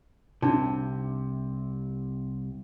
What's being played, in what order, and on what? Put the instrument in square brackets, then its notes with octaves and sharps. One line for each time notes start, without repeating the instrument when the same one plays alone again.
[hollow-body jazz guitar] C2 C3 [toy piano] D4 D#4